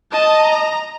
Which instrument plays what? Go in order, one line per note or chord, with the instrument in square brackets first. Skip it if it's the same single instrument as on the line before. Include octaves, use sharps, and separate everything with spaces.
[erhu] D#5 [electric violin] A5
[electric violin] A#5